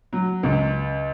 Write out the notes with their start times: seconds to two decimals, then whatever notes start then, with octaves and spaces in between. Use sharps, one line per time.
0.13 F#3
0.43 C#2